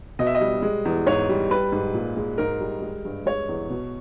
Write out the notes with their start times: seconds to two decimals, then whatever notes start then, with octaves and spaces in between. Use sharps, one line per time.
0.19 B2 D#5
0.27 E5
0.35 D#5
0.41 G3
0.62 G#3
0.85 E2
1.06 G#2 C#5
1.29 G3
1.51 G3 B4
1.72 G#2
1.94 A#2
2.17 G#3
2.38 G#2 A#4
2.61 G3
2.82 G#3
3.05 G2
3.26 G#3 C#5
3.49 E2
3.70 B2